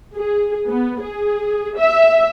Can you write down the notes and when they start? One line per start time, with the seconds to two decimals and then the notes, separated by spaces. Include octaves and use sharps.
0.17 G#4
0.69 B3
1.02 G#4
1.78 E5